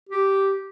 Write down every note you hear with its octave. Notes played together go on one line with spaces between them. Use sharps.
G4